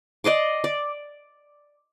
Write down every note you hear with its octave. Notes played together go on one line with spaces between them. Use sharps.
D5 D#5 C6 D6
D5